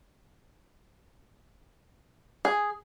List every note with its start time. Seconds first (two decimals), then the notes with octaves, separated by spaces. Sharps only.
2.45 G#4